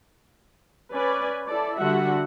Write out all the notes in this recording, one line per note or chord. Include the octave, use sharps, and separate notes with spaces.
C#4 B4 D5 G#5
E4 A4 D5
D3 G3 F#4 E5 F#5